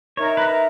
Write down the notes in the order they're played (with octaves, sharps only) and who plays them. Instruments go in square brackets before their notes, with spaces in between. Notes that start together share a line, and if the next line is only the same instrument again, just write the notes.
[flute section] D#4 A#4 E5 A#5 [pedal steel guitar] C#5
[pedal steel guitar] B4